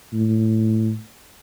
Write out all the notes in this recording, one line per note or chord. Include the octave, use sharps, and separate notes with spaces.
A2